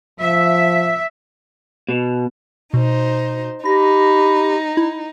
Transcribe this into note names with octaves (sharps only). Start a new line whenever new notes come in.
F3 E5
B2
B2 D#4 C5
D#4 G4 B5 A#6
E4